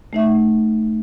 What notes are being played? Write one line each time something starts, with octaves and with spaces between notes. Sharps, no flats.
A3 D#4 E5